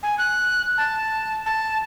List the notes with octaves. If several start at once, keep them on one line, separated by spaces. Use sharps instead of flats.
G#5
F#6
A5
A5